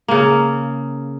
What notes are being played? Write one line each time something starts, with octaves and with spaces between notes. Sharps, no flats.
C#3 A#3